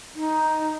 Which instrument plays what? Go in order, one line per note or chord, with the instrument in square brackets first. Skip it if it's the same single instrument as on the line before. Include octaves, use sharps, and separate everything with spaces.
[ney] D#4